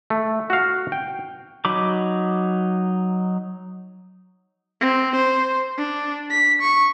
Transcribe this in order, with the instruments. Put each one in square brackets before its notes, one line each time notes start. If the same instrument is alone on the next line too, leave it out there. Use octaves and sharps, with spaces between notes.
[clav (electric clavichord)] A3
F#4 F5
G5
[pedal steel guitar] F#3 D#4 B5 D6
[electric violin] C4
C5
D4
B6
C#6